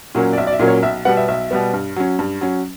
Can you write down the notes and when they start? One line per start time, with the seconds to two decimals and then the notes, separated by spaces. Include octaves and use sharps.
0.15 A#2 F#3 A#3 C#4
0.33 D5
0.37 B1 E5
0.47 D5
0.53 E5
0.59 A#2 F#3 A#3 C#4
0.68 C#5
0.82 B1 E5
1.05 B2 G3 B3 F#5
1.17 E5
1.28 B1 E5
1.51 B2 G3 B3
1.73 G2
1.96 F#3 C#4
2.19 G2
2.41 F#3 C#4